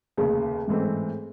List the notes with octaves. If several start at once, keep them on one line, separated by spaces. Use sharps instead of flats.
F1 D#2 C#3 G#4
A1 G#2 E3 A3 C4